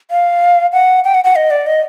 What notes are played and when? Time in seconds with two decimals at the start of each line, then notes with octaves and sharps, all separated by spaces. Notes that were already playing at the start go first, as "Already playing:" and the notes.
0.11 F5
0.73 F#5
1.04 G5
1.14 F#5
1.24 F#5
1.36 D#5
1.51 D5
1.67 D#5